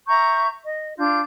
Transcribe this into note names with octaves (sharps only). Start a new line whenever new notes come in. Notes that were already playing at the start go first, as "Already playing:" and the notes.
E5 A#5 C#6 G6
D#5
D4 F4 G6